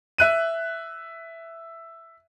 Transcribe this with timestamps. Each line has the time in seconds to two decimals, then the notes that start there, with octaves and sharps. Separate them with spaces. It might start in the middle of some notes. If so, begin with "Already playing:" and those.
0.18 E5 F#6 D#7